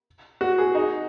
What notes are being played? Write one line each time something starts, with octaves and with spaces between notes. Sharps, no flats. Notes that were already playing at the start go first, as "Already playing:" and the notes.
F#4
G#4
D#4